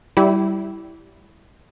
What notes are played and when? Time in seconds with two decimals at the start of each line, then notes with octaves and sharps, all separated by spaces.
0.17 G3 E4